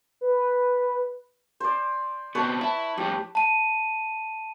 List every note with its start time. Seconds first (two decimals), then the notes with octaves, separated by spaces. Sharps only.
0.21 B4
1.60 C5 D5
2.35 B2 C4 B4 C#5 A5
2.61 E4 A5
2.97 F2 A2 G4
3.35 A5 D#7